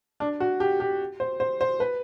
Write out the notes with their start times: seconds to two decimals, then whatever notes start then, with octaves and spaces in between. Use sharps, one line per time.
0.20 D4
0.40 F#4
0.60 G4
0.80 G4
1.20 C5
1.40 C5
1.61 C5
1.80 B4